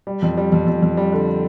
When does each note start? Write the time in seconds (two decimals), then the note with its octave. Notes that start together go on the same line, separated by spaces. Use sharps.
0.07 G3
0.22 F2
0.37 G3
0.52 F2
0.67 F2
0.82 F2
0.97 G3
1.12 D3